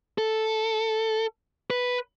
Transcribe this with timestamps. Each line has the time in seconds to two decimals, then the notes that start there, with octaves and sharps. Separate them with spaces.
0.18 A4
1.70 B4